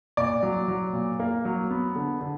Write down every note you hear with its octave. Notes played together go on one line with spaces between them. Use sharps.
A#2 D5
F#3
F#3
A#2
A#3
F#3
B3
D3
D3